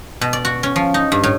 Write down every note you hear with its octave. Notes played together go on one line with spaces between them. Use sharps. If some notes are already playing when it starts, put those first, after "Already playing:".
B2
D5
F#4
C#4
F3
D#4
G2
A2